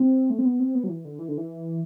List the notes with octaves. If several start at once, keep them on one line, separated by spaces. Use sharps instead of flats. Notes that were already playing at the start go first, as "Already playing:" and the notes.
Already playing: C4
A3
C4
B3
C4
B3
F#3
E3
D3
E3
D3
E3